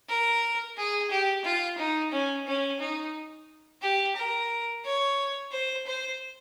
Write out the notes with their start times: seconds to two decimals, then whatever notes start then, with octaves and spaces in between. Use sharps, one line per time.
0.09 A#4
0.77 G#4
1.10 G4
1.45 F4
1.78 D#4
2.12 C#4
2.47 C#4
2.80 D#4
3.82 G4
4.16 A#4
4.85 C#5
5.52 C5
5.87 C5